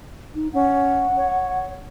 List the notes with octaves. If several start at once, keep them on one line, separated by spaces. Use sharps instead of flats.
D#4
C#4 F#5
C#5